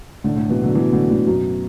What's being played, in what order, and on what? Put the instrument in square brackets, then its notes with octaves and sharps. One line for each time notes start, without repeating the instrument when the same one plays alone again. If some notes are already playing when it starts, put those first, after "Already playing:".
[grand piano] A2 D3
A2 D3
B2 E3
D3 F#3
B2 E3
A2 D3
A2 D3
F#2 B2